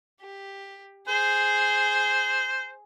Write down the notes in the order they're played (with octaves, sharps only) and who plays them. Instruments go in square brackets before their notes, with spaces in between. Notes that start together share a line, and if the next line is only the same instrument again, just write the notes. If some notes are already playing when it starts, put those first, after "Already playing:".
[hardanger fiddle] G4
[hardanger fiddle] G#4 [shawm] C5